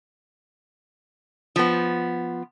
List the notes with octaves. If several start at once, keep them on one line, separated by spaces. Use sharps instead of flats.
F3 B3